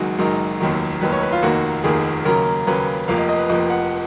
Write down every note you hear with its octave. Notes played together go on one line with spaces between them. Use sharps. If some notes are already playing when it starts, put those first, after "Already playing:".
Already playing: F#1 F#2 D#3 G#3 F#4
F#1 F#2 D#3 G#3 A#4
F1 D#2 D#3 F#3
F1 D#2 D#3 F#3 B4
C#5
B4
F4
F1 D#2 D#3 A#3 F#4
F1 D#2 D#3 A#3 G#4
D#2 C#3 F#3 A#3 A#4
D#2 C#3 F#3 A#3 B4
F1 F2 F3 A#3 F5
D#5
D#5
B4
F1 F2 F3 A#3 D#5
F#5